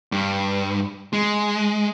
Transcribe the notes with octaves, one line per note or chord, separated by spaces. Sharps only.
G2
G#3